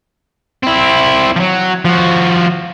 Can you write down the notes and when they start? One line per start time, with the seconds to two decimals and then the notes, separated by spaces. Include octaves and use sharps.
0.63 C4 E4
1.36 F3 F#3
1.85 F3 F#4